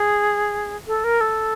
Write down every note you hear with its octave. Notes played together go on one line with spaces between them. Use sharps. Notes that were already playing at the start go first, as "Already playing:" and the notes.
Already playing: G#4
A4
A#4
A4